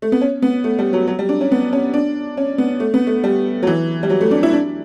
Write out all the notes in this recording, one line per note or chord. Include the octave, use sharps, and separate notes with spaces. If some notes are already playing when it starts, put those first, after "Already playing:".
A3
B3
C#4
B3
A3
G3
F#3
F#3
G3
D4
C#4
B3
C#4
D4
C#4
B3
A3
B3
A3
G3
F#3
E3
G3
F#3
A3
D4
E4
D4